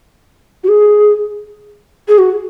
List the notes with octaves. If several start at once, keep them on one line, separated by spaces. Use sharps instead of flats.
F#4
G#4
G#4
F#4